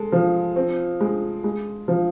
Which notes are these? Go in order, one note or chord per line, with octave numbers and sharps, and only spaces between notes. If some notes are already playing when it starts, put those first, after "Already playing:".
Already playing: G#3 A4
F3
C4
G#3
G#3
F3